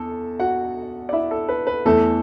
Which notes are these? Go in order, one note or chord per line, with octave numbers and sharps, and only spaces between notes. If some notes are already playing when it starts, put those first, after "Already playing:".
Already playing: E2 A4
F#4 F#5
D5
E4 E5
A4
B4
B4
E2 E3 A3 A4